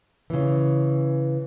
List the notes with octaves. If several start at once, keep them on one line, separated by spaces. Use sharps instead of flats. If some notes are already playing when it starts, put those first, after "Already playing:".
C#3 E3